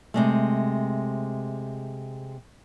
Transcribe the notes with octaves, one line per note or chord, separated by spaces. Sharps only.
C3 G#3 A3